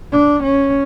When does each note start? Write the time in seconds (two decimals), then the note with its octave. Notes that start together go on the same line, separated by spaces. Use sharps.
0.12 D4
0.43 C#4